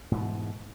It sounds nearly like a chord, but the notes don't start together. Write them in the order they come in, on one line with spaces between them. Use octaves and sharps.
G#2 E3 B2